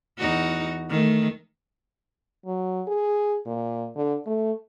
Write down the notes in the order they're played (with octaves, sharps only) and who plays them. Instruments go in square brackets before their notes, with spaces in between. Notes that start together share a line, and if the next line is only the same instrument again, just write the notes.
[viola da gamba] E2 D#4 F#4
D#3 A3
[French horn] F#3
G#4
A#2
D3
A3